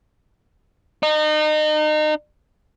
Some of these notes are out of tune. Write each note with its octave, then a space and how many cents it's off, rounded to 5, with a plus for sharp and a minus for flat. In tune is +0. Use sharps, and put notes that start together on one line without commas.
D#4 -30